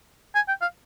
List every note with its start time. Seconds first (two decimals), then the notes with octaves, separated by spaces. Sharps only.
0.35 G#5
0.48 G5
0.62 F5